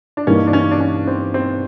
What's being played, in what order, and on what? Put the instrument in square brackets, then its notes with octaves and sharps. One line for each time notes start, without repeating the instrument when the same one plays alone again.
[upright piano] D4
[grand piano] G2 E3 G3 A#3 D#4 [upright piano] C#4
[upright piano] D4
C#4
D4
C#4
C4
C4